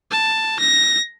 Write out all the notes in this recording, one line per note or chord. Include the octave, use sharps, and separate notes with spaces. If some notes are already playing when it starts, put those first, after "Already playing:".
A5
A#6